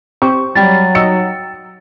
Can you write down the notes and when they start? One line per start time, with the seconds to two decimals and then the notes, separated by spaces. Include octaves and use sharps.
0.22 C4 G4 C5 C#6
0.55 F#3 G3 G5 A6
0.95 D#4 F#4 D#5 E6 C#7